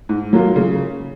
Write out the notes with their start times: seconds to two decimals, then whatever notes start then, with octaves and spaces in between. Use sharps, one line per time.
0.09 G#2
0.33 F#3 A#3 F4
0.56 C#3